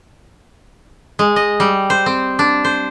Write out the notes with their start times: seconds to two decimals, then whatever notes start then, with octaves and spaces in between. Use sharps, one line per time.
1.19 G#3
1.36 D#5
1.60 G3
1.90 C5
2.06 C4
2.39 D4
2.65 C5